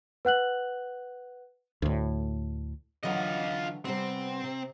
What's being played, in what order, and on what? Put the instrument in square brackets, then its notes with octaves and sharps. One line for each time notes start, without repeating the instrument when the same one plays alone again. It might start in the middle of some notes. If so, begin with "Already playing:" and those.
[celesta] B4 F#5 F#6 F#7
[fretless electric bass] D2 A2
[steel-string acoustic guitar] D3 E3 F#3 [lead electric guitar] F4 D#5
[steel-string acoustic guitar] C3 G3 B3 [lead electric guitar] C4
[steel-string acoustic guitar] C3